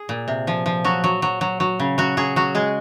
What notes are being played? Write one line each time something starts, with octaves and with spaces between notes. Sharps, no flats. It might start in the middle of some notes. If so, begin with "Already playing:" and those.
Already playing: G#4
A#2
C3
F3
F3
F#3 F#4
F#3
F#3
F#3
F#3
C#3
F#3 F#4
F#3 G#4
F#3 F#4
G#3 G#4